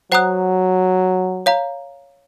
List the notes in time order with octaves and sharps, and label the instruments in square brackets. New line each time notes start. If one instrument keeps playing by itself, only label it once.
[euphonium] F#3 [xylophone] C5 F#5 A#5 D#6 F#6
[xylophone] C#5 F5 A#5